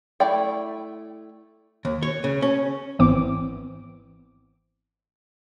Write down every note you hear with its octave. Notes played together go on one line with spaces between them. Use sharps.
A3 E4 D5 G5
D#2
C#5
C#3
C#4
G#1 E3 B3 C4 D6